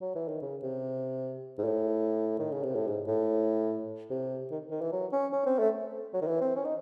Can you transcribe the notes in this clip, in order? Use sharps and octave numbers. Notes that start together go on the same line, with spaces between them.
F#3
E3
D#3
C#3
C3
G#2
A2
D#3
C#3
C3
A2
G#2
A2
C3
D#3
D#3
E3
F#3
C#4
C#4
C4
A3
F#3
D#3
E3
C4
C#4
D#4